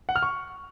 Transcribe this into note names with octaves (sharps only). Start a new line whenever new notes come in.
F#5
F6
C#6